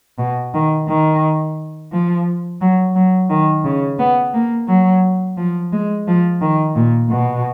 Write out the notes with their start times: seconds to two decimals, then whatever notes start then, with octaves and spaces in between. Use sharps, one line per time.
0.18 B2
0.54 D#3
0.89 D#3
1.92 F3
2.61 F#3
2.95 F#3
3.30 D#3
3.65 C#3
3.99 B3
4.34 A#3
4.68 F#3
5.37 F3
5.72 G#3
6.08 F3
6.41 D#3
6.76 A#2
7.10 B2